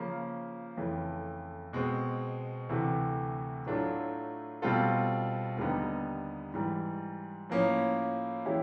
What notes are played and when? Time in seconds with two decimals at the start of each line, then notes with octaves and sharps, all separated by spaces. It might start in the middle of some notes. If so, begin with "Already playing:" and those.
Already playing: C#3 F3 A#3
0.77 F2 C#3 E3 A3
1.73 B2 G#3 C4
2.69 D2 C3 E3 A3
3.66 A2 F#3 A3 D4 F4
4.62 B2 G3 C4 F4 A4
5.57 D#2 D3 G3 B3 D#4
6.54 G#2 E3 G3
7.50 A2 F3 A#3 C#4
8.45 E3 G#3 C#4 E4 G4